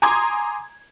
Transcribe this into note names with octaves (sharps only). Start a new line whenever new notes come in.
G#5 A#5 C6 D6 D#6 G#6